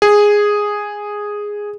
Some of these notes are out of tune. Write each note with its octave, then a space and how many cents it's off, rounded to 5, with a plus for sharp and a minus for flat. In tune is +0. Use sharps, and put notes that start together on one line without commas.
G#4 -5